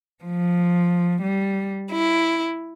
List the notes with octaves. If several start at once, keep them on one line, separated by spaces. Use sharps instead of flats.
F3
G3
E4